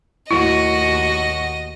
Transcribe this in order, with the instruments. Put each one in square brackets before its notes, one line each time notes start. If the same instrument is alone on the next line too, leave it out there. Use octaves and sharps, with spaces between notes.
[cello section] D#2 A2 F#4 [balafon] E4 [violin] D#5